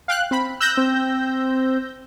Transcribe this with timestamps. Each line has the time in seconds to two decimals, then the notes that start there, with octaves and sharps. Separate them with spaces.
0.08 F5 G5 F#6
0.31 C4 B5
0.60 E6 F#6 G6 A#6
0.77 C4